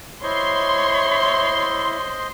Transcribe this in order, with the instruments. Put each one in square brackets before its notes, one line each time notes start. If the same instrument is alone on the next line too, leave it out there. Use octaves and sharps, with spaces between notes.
[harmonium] E4 [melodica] C5 D#5 [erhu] C#5 [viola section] C6